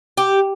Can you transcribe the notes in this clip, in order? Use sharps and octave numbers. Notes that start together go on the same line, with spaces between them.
G4